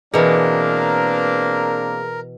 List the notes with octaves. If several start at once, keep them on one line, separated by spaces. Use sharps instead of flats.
B2 E3 A#3 C4 D4 G#4 A#4 B4